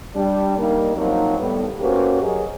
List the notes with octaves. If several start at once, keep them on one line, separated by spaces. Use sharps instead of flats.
G3 D4
G3 A#3 D#4
F3 F#3 A#3 C4 D#4
A2 G3 B3
A#3 C#4 F#4 G4 B4 C5
F#3 G#4 A#4 D#5